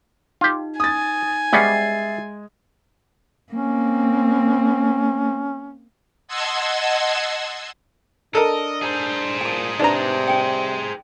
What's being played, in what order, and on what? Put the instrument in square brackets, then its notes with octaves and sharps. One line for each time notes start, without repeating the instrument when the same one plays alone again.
[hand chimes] D#4 [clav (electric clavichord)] F4 G4
[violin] G#5 [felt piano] D#6 A6
[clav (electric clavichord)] G3 B3 C#4 [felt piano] G#3 [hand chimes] E5 A6 C7
[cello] A#3 C4 [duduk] C#4
[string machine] D#5 F#5 A5 C6 E6 G#6
[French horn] D4 [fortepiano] A4 A#4 [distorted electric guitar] D#5
[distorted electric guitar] G#4 C5
[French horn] A#2 [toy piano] G#5 A5
[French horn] C3 [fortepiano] D4 A#5 [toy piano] D#4 B4
[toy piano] G5 G#5